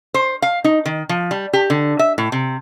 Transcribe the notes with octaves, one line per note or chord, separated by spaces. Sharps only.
C5
F5
D#4
D#3
F3
G3
G4
D3
E5
A2
C3